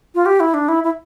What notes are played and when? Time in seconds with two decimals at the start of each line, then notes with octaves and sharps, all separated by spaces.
0.15 F4
0.26 G4
0.40 E4
0.54 D4
0.68 E4
0.84 E4